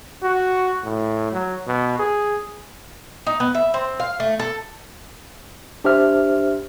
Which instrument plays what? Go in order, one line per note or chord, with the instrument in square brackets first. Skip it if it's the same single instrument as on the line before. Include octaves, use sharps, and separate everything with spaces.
[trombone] F#4
A2
F#3
B2
G#4
[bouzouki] D#4
B3
E5
C4
F5
A3
A4
[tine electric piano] D4 G4 C5 E5 F6